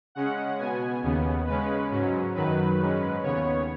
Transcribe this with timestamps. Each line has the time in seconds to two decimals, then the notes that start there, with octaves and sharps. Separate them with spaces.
0.15 C#3 G#3 C#4 F#5
0.59 B2 B3 G#5
1.03 D#2 C#3 B3
1.47 C#3 G#3 C#4 B4
1.90 G#2 F#3 C#4
2.35 F#2 D#3 F#3 B4
2.78 G#2 G#3 C#4
3.23 D#2 C#3 B3 C#5